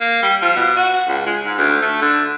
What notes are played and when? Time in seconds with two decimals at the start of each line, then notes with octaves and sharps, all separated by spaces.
0.01 A#3
0.22 G3
0.42 F3
0.56 B2
0.76 F#4
1.08 C#2
1.26 G#3
1.45 G#2
1.58 D2
1.82 A3
2.01 D3